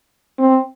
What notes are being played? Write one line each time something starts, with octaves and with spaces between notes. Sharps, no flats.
C4